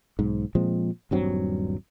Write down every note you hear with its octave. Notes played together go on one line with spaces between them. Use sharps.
B1 G#2
A#2 F3 G#3 C4
D#1 G2 F#3 C4